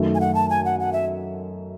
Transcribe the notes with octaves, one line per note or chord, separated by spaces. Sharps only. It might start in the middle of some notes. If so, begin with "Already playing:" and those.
Already playing: F#2 D#3 A3
G#5
F#5
A5
G#5
F#5
F#5
E5